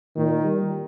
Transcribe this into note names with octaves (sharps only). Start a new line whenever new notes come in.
A#2 D#3
G3